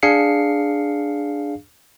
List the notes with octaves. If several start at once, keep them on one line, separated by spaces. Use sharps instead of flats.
D4 G#4 F5 C7 C#7